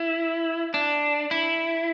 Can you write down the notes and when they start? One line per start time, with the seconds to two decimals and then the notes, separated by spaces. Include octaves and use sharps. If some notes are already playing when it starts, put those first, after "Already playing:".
Already playing: E4
0.74 D4
1.31 E4